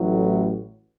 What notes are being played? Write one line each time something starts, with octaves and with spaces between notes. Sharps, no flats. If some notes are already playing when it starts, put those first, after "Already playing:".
Already playing: A1 A2 F#3